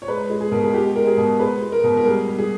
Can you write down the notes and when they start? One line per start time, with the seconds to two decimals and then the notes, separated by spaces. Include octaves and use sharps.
0.02 C#5
0.08 G#3 B4
0.30 G#3
0.40 G#4
0.51 B2 A#4
0.62 G#4
0.74 G#3 G4
0.96 G#3 A#4
1.07 G#4
1.17 B2
1.39 G#3 B4
1.61 G#3
1.72 A#4
1.84 B2
1.97 A#4
2.05 G3 G#4
2.28 G3
2.38 G#4